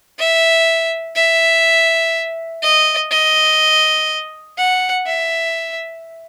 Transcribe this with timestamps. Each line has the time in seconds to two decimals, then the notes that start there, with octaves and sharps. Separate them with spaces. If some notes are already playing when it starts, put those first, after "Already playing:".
0.19 E5
1.16 E5
2.63 D#5
3.11 D#5
4.58 F#5
5.07 E5